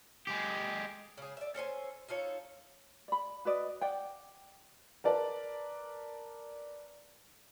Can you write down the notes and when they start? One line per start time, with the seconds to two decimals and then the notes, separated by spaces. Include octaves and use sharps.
0.27 G#3 G4
1.18 C#3 G#4
1.37 D5 E5
1.55 C#4 A4 C5 G#5
2.09 D#4 F4 A4 C#5
3.08 D5 B5
3.45 F#4 B4 D5 D#5
3.81 D5 F#5 G5
5.04 A#4 B4 D5 A5